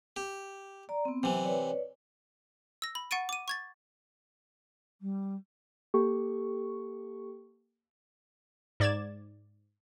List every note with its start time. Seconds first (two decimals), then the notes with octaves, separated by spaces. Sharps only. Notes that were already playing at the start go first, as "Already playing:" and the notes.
0.16 G4
0.89 D5 A#5
1.05 B3 C4
1.23 C3 E3 F#3
1.44 B4 C#5 D5
2.82 E6 A#6
2.95 B5
3.11 F#5 C#6 A6 D7 D#7
3.29 D6 D#7
3.48 C#6 G#6 A6
5.01 G3
5.94 A#3 G4 A4 C#6
8.80 G#2 D5 G#6 A6 E7